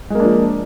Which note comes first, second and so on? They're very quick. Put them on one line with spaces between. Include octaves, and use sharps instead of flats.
G#3 A#3 D4 F3